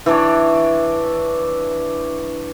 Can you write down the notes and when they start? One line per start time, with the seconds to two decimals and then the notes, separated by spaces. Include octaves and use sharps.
0.06 E3 D4 C#5